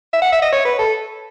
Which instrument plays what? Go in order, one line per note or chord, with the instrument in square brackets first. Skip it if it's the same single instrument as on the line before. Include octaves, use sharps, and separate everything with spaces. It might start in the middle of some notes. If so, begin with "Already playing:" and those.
[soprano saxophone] E5
F#5
E5
D#5
C#5
B4
A4